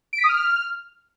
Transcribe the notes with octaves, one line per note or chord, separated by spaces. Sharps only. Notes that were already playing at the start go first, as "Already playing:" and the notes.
D7
B6
D#6
F6